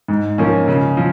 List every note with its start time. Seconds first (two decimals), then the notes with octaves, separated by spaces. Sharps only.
0.08 G#2
0.38 F3 A#3 C#4
0.68 C#3
0.97 F3